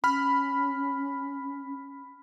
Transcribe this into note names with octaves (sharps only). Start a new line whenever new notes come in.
C#4 B5 F6